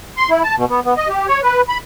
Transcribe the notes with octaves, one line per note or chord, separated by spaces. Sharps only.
C6
E4
A5
B2
B3
B3
D#5
G4
C#5
B4
B5